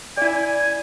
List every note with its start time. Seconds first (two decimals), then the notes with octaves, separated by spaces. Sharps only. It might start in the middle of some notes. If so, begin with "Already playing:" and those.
0.17 E4 D5 G#5